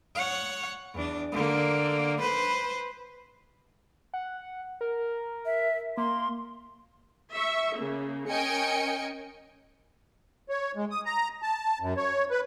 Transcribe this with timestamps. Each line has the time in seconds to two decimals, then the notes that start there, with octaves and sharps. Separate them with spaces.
0.15 C#5 F#5
0.94 E2 D4
1.32 D3 A#3
2.20 B4 C5
4.14 F#5
4.81 A#4
5.46 E5
5.97 A#3 C6
7.33 E5 C#6
7.76 C#3 A#3
8.30 C#4 A#4 D#5 G5 G#5 C#7
10.49 C#5
10.76 G#3
10.91 D#6
11.06 A#5
11.42 A5
11.80 F#2
11.97 C#5
12.30 B4